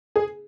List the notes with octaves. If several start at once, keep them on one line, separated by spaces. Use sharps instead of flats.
G#4